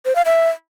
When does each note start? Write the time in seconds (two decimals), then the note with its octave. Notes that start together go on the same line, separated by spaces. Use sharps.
0.05 C5
0.15 F5
0.26 E5